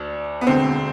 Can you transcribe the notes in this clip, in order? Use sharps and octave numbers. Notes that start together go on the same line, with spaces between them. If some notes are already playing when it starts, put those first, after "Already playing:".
Already playing: D2 D4
B3
E1 D2 D3 C4